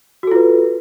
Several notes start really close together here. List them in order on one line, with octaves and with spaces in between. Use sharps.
F#4 A4 F4 B4